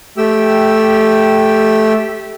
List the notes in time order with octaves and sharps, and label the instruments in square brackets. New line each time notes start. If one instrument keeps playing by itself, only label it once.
[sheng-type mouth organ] A3 G4 G5 E6